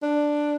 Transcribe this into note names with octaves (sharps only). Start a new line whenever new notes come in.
D4